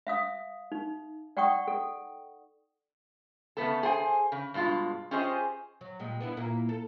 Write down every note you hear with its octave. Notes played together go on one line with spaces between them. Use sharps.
E5 F5 D#6
D#4
D5 F#5 G5 C#6 D#6
A4
C#3 A3 B3 A4
G#4 C5 G5 G#5
C#3
G2 B2 G#3 F4
C#4 F4 G4 G#4 C5 D#5
F#3
A#2 G3 G#3
B3 D4 E4
A#2 A#3 E4
A4